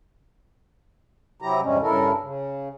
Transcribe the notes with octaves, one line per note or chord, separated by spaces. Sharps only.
C3 F#3 E4 G4 A#5
E2 G2 C3 G3 G#3 C#4
G2 C#3 E4 A4 A#4
C#3